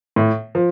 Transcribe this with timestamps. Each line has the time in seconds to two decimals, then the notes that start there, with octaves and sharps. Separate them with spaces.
0.16 A2
0.55 F3